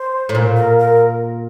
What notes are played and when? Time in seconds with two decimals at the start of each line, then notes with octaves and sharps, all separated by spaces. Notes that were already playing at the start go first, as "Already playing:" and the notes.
Already playing: C5
0.29 A2
0.35 A#2
0.57 A#4
0.79 A#4